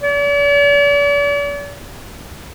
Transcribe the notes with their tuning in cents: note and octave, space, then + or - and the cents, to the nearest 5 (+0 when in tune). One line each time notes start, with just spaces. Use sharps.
D5 -45